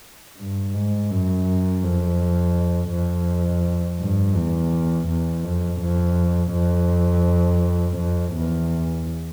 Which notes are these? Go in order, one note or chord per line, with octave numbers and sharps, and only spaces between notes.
G2
G#2
F#2
F2
F2
G2
E2
E2
F2
F2
F2
F2
E2